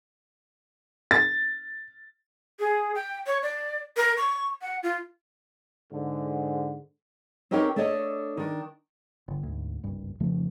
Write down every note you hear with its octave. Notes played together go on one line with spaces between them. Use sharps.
A6
G#4
G5
C#5
D5
A#4
C#6
F#5
F4
G#2 D3
C4 C#4 D#4 G4 A#4 C#5
A3 D4 A4 C#5 D#5
D#3 D4
G1 D3
D2 G#2
F#1 C2 G2
F2 C#3 F3 A3